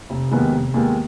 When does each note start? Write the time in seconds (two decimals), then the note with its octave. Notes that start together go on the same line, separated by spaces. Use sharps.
0.10 F1
0.31 D#2 D#3 G#3 B3
0.53 F1
0.74 D#2 D#3 G#3 B3